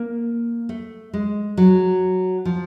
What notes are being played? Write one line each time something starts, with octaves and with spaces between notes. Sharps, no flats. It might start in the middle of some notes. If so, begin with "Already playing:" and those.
Already playing: A#3
A3
G#3
F#3
F3